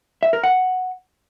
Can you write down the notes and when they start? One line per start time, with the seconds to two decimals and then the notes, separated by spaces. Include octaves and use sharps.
0.23 E5
0.33 A#4
0.43 F#5